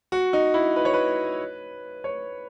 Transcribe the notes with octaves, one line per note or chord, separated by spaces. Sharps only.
F#4
D#4
E4
B4
C#5
B4
C#5